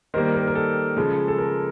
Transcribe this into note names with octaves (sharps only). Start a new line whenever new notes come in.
D#3 G3 A#3 A#4 C5
A#4
A#4
A4
C#3 F3 G#3
A4
A#4